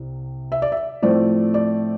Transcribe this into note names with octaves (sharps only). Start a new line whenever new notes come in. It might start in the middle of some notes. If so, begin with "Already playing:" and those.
Already playing: C2 C3
E5
D5
E5
A2 F3 A3 C4 D5
D5